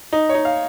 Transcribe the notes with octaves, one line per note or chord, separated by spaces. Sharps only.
D#4
C#5
D#4
F5